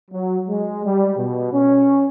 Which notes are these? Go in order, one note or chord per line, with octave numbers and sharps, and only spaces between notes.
F#3
G#3
G3
B2
C#4